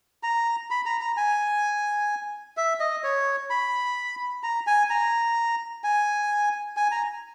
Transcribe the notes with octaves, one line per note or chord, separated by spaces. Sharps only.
A#5
B5
A#5
A#5
G#5
E5
D#5
C#5
B5
A#5
G#5
A#5
G#5
G#5
A#5